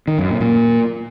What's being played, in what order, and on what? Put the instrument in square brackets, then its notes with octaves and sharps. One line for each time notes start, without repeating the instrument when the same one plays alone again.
[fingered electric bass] D#3
F#2
A#2
A#2